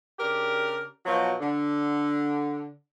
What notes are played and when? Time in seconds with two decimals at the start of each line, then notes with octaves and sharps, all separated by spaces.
0.19 C#3 D4 G4 A#4
1.06 B2 F3 F#3
1.39 D3